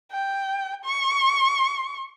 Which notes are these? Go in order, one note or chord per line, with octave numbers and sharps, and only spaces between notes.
G5
C#6